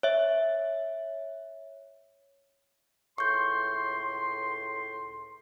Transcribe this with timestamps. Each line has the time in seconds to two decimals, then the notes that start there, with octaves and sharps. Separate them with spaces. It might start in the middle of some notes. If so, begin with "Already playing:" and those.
0.03 C#5 E5
3.18 C#2 A2 C6 C#6 G6